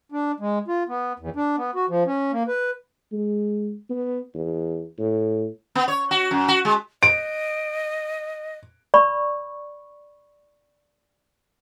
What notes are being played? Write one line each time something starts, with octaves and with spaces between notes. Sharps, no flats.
D4
G#3
F4
B3
E2
D4
B3
F#4
F3
C#4
A#3
B4
G#3
B3
E2
A2
B3
C#5
F#4
F#2
F#4
G#3
D#5 D7
D5 B5 C#6